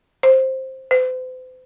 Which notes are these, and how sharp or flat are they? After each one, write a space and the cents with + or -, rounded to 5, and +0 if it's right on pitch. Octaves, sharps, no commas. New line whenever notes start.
C5 +10
C5 -40